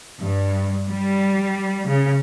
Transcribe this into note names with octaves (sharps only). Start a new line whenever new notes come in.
G2
G3
C#3